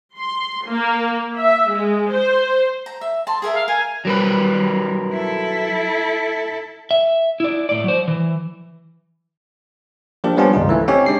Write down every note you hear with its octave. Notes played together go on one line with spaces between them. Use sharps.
C6
A#3
E5
G#3
C5
A#5
E5
A5 C6
G#4 A#4 E5
F5
A#4 G#5
F#3 G3 A#4 B4
E4 A4
E5
E4 D5
A2 D5
F#3 C5
E3
F3 A#3 D4 G4
F3 G3 B3 C#4 D4 F4
G1 C#2 D#4 F4
E3 A3
C4 C#4 D#4 G4 C#5
G#3 D4 C7